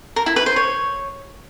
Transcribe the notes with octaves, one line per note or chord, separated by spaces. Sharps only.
A#4
E4
B4
C5
C#5